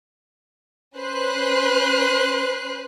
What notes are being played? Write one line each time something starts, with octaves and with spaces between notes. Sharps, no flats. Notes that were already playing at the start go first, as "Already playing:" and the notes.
C#4 B4 C5 F#6 C7